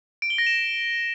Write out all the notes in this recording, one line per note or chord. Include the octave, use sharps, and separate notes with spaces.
D7
G7
A#6
E7